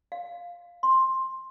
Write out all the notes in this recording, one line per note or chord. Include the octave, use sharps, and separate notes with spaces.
F5
C6